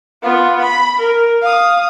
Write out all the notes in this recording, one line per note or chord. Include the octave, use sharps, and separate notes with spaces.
B3 F4
B5
A#4
F5 D#6